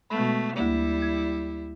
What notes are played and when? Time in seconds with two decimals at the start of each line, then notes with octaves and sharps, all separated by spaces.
0.10 B2 G#3 A3 B5
0.56 D2 G3 A#3 E4
1.02 G#6